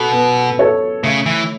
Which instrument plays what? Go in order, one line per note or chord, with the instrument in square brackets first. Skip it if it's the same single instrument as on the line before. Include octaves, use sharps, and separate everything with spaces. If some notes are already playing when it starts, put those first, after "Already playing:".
Already playing: [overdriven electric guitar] B2 [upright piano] A4
[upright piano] B3
A4 C#5 E5
[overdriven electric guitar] C#3 [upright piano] A3
[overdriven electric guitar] E3